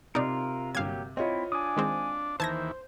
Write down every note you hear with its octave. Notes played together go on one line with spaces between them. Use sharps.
C3 D#4 F4 A#4 D5
G1 F#3 A#3 G4 F5 G#6
C4 E4 F4 C#5 D#5
D4 G#5 D#6
D#3 G#3 C4
D#2 E3 C5 A5 G#6 A#6